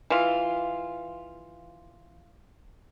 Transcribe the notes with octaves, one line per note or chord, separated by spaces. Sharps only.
E3 F4